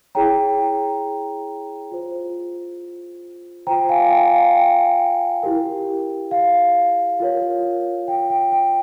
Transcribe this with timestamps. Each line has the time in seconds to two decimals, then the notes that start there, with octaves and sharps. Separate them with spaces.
0.15 E4 G#4 C#5 G5 A#5
1.91 F4 C5
3.67 F4 C5 G5 A#5
3.89 F5 G#5
4.12 G5
4.33 F5
4.56 G5
5.43 E4 G4 A#4
6.31 F5
7.20 F4 A#4 C#5
8.08 G5
8.30 G5
8.52 G5